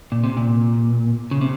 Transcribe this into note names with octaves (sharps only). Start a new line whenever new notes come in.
A#2
C3
A#2
C#3
C3